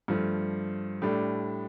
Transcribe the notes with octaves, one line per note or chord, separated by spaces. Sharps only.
G2 F3 A3
A2 G3 D4 A4